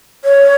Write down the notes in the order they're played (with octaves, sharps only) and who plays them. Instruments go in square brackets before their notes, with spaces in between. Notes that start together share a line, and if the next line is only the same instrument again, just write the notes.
[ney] C#5